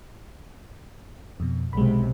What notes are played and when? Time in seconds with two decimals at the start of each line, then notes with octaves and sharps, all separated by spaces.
1.40 F2 B2
1.73 B1 C3 G#3 B5